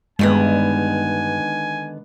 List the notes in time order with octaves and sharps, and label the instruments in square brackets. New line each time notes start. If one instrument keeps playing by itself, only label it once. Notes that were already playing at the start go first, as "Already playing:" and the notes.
[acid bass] G2 [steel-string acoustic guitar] D3 D#3 B3 [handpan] G#3 [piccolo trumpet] G#5